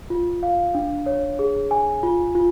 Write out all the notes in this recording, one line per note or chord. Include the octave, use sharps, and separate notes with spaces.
F4
F5
D4
C#5
G#4
G#5
F4
F4